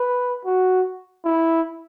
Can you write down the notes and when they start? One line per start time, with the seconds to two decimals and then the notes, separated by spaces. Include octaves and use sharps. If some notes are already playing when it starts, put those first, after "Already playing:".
Already playing: B4
0.45 F#4
1.25 E4